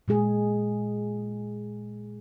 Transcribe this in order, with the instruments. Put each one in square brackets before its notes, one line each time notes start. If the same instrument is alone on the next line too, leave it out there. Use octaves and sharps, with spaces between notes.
[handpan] A#2 G#3 G#4